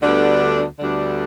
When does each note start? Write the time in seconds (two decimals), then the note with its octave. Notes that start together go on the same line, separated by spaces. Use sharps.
0.01 D2 D3 G3 B3 D4
0.79 D2 D3 G3 B3 D4